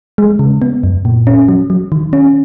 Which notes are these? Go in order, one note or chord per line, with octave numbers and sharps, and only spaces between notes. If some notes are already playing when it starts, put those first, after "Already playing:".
G#3
C#3
B3
F#2
A#2
C#4
F#3
F#3
D#3
C#4